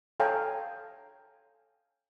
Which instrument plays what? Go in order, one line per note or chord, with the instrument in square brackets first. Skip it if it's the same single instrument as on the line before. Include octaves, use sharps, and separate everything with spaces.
[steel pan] A4 C#5 F5 G5 G#5 A#5